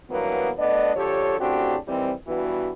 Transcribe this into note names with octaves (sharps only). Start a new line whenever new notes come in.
G2 E3 F#3 A#3 B3
A3 B3 D4 D5 D#5
D3 F3 G4 A4 C#5
A2 C#3 C4 D4 F#4 G4
D#3 E3 G3 C4
G2 E3 B3 F#4